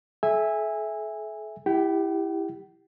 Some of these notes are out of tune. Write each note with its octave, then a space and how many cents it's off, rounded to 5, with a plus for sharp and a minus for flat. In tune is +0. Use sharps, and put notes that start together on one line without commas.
A4 -45 E5 -5 G#5 -20
E4 +0 G4 +15 G5 -45